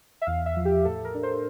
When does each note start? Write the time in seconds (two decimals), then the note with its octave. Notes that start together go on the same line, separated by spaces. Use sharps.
0.22 E5
0.26 E2 F5
0.46 E5
0.56 F3
0.65 G4
0.85 A2 A4
1.05 A#4
1.14 D4
1.23 C5